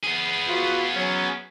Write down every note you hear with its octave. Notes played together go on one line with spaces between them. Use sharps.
B3 G#4
F4 F#4 B4
F#3 C#4